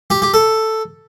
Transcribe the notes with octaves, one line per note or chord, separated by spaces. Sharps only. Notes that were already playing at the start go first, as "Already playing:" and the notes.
G4
G4
A4